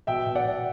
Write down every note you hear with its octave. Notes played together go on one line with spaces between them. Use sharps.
B2 E5 G5
B2
D5 F#5
B2